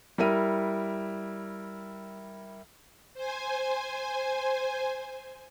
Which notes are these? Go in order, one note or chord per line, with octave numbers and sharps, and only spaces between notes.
G3 E4 A#4 D#7
C5 G#5